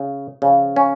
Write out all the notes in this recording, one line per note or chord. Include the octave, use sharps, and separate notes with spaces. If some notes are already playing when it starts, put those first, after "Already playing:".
Already playing: C#3
C#3 F3
C#4